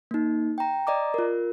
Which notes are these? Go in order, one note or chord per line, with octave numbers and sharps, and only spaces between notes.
A#3 D#4
G5 A#5
D5 D#5 A#5 D6
F4 A#4